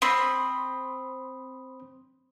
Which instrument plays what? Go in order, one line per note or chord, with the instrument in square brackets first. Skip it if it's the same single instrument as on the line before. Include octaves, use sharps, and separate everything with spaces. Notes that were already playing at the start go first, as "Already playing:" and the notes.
[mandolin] C4 [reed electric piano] B5 C6 D#6